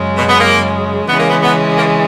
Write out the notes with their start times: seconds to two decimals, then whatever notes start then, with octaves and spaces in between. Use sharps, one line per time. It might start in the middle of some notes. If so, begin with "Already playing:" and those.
Already playing: F#2 C#3 G#3
0.16 B2
0.29 B3
0.39 A#3
1.08 C#3 E3 G#3 B3 C#4
1.20 A#3
1.30 B3
1.43 B3
1.77 A#3